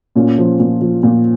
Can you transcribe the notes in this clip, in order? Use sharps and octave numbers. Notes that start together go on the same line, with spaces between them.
A#2 C#4
F3
A#2
F3
A#2